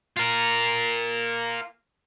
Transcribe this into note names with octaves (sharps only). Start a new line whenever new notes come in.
F4 A#4